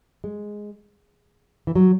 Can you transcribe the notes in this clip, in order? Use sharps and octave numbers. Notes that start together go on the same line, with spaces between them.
G#3
E3
F#3